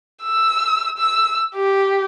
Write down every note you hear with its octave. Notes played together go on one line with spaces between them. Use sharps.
E6
E6
G4